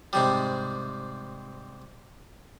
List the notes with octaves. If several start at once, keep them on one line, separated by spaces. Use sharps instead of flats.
G#2 C3 G3